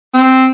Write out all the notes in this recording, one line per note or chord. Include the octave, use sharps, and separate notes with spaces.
C4